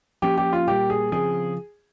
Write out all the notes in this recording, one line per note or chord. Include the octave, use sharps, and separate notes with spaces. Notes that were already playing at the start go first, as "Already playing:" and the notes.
F3 A#3 C#4 G4
G4
F4
A#2 G3 A#3 G4
G#4
C#3 F3 C4 G#4